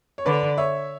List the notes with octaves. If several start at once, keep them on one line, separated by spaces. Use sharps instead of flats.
C#5
D3 B4 D5
C#5 E5